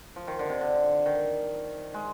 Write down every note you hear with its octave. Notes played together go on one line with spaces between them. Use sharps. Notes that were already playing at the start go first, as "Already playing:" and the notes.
F3
D#3
D3
C3
D3
D#3
G#3